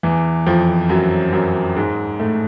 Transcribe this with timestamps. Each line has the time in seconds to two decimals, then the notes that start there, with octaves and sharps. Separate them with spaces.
0.03 E2 E3
0.47 F2 F3
0.89 F#2 F#3
1.33 F#2 F#3
1.76 G#2 G#3
2.19 A2 A3